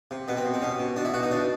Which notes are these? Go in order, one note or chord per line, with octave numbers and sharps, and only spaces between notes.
C3
B2 B3
C4
B2
C4
B2 C#4
B2
B2 D4
E4
B2 F#4
D#4
B2 D4